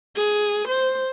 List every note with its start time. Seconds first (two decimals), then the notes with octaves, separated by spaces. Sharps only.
0.16 G#4
0.68 C5